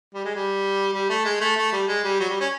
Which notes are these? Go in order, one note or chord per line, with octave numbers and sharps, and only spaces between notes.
G3
G#3
G3
G3
A3
G#3
A3
A3
G3
G#3
G3
F#3
G3
C#4